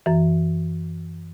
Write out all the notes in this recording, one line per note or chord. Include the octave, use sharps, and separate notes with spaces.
F#2 E3